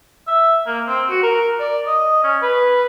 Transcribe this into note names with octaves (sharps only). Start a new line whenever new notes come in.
E5
A#3
C4
F#4
A#4
D5
D#5
C#4
B4